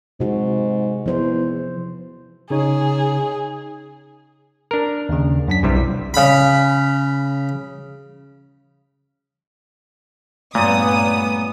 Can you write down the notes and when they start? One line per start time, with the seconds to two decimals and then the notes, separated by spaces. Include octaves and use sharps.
0.20 G#2 C3 F#4
1.06 E2 F3 C5
2.50 C#3 D#4 G#4 C#5
4.71 D4 A#4
5.09 D#2 C#3
5.48 F#2 D4 B6
5.63 B1 G2 C3 G3 E4
6.14 C#3 B5
10.55 G2 A#2 A3 B3 C#5 A#5 D#6